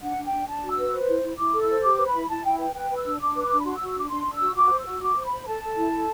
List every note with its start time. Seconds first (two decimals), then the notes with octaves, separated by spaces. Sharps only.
0.01 D4 F#5
0.18 D4
0.24 G5
0.32 D4
0.47 D4 A5
0.62 F#4
0.70 E6
0.78 B4
0.92 C5
1.08 E4
1.23 E4
1.38 E4 D6
1.53 A4
1.60 E6
1.69 C5
1.83 G4 D6
1.98 B4
2.06 B5
2.13 E4
2.28 E4 A5
2.44 E4 G5
2.59 B4 G5
2.74 B4 G5
2.90 B4
2.96 E6
3.04 D4
3.20 D4 D6
3.35 B4
3.42 D6
3.50 D4
3.59 B5
3.64 F#4 C6
3.76 E6
3.80 F#4
3.88 E6
3.95 D4 D6
4.10 D4 C6
4.25 D4
4.34 E6
4.41 F#4
4.55 F#4 D6
4.71 C5
4.78 E6
4.86 F#4
5.01 F#4 D6
5.16 C5
5.23 B5
5.32 C5
5.47 A4 A5
5.62 A4
5.76 E4
5.92 A4